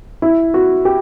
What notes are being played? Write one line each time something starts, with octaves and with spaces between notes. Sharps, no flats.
E4
F#4
G4